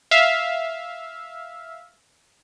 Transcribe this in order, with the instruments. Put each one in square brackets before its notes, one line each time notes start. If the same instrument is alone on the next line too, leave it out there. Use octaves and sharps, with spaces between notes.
[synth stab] E5 F5